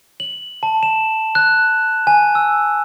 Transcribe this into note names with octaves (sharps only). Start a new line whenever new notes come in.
F#7
A5
E7
F#6
G#5
E6